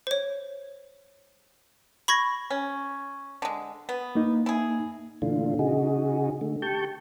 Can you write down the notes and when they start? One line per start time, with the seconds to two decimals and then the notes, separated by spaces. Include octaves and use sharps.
0.07 C5 C#5
2.08 B5 C#6 G#6 A#6
2.50 C#4
3.42 D3 G#3
3.89 B3
4.15 A#3 D#4
4.46 E4 G#4
5.22 A#2 D3 E3 A3 D4 F4
5.59 C#3 D#4 F#4 G#4
6.41 D3 A3
6.62 G4 A5 C#6 G6